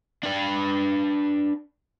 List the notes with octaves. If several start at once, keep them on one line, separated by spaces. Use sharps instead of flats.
D4 B4